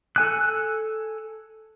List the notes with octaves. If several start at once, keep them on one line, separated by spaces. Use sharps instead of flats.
A4 G#5 F#6